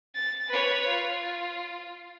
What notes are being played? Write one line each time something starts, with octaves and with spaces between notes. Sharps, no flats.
A6
B4 C#5
F4